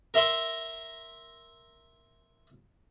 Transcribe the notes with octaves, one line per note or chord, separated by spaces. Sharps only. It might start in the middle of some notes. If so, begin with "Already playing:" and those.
A#4 E5 C6